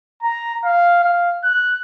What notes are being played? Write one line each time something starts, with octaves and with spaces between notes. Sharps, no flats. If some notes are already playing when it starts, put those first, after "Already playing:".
A#5
F5
F5
F#6